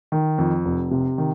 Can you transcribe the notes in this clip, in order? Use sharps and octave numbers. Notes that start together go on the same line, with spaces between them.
D#3
F2
F1
C3
D#3